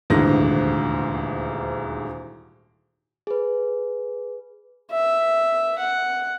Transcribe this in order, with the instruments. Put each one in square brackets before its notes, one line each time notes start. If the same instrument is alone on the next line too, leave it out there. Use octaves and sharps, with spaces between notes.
[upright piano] D#1 D2 G#2 E3 A#6
[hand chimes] G#4 B4
[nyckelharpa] E5
F#5